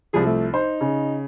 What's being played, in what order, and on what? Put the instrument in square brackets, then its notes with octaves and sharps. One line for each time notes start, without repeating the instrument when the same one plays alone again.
[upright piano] C2 F3 [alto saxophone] G#4
[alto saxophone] A3
[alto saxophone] D#4 [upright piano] C5
[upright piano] C#3